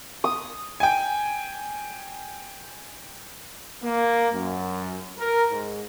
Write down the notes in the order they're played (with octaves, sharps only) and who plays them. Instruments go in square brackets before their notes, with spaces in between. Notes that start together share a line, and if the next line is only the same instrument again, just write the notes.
[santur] D#6
[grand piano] G5 G#5
[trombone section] A#3
F#2
A#4
G#2